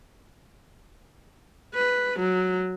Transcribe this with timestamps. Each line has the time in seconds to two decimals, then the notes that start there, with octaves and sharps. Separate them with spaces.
1.75 B4
2.21 F#3